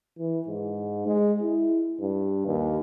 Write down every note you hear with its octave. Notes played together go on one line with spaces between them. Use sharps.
E3
G#2
G#3
E4
G2
D#2